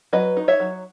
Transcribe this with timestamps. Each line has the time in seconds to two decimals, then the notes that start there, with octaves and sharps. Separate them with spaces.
0.13 F#3 B4 D#5
0.37 D#4
0.48 C#5 E5
0.60 F#3